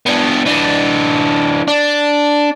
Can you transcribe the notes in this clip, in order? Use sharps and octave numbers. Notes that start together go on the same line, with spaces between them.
B3 D4
E3 D4
D4